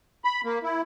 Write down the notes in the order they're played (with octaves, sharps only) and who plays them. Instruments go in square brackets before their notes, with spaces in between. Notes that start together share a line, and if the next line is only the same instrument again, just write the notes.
[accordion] B5
A#3
E4